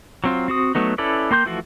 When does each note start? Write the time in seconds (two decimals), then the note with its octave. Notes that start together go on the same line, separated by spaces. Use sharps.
0.24 F#3 C4 F4
0.48 C4 F#4 D#6
0.75 F#3 A3 B3 D#4
0.98 C#4 E4 A4 B4 D5
1.31 A#3 G5 C6 G6
1.46 E3 F3 A3 F4 F#4